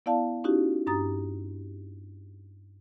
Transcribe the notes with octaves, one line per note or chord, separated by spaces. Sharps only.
B3 E4 D5 F5 A5
C#4 D#4 E4 F#4 G4
G2 D4 G4 A#5 D#6 A6